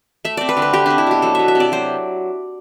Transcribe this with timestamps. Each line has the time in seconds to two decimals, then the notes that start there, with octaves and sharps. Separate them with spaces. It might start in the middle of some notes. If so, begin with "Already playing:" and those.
0.25 A3 E5
0.37 C4 D5
0.49 B4
0.57 D3
0.62 B4
0.73 A3 G4
0.86 C4 D4
0.98 E4
1.07 B2 G4
1.22 F#3 A4
1.35 B3 E5
1.48 E5
1.55 C3
1.60 D5
1.72 F#3 C5